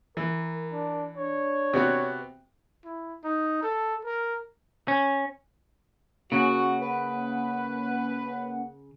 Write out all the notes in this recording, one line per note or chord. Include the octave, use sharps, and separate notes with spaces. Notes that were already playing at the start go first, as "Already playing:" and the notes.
E3 A#4
D4
D4 C#5
C3 B3 F#4
E4
D#4
A4
A#4
C#4
C#3 A#3 C#4 F#4 F#5
B4